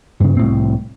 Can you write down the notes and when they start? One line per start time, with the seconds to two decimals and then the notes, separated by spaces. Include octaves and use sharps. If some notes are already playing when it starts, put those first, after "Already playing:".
0.20 G2 C#3
0.37 C2 A2 C4